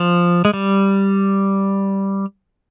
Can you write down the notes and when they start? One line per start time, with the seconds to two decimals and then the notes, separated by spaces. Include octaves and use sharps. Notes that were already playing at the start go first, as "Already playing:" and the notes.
Already playing: F3
0.45 G#3
0.53 G3